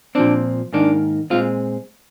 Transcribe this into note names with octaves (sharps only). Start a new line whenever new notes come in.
A#2 F3 C4 D4
G#2 D#3 A#3 D4
A#2 G#3 C4 F4